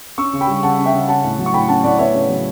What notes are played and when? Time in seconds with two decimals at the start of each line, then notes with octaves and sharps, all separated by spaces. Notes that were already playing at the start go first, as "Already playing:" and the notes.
0.18 C#4 C#6 E6
0.33 C#3
0.41 G5 B5
0.48 G3
0.63 C#3 F#5 A5
0.78 C#4
0.85 E5 G5
0.93 C#3
1.08 C#4 F#5 A5
1.24 A2
1.39 F#3
1.46 C#6
1.54 A2 G5 B5
1.69 C#4 F#5 A5
1.84 A2 D5 F#5
1.99 B3 C#5 E5
2.14 C#3
2.29 F#3